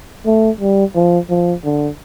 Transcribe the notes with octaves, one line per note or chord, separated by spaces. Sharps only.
A3
G3
F3
F3
D3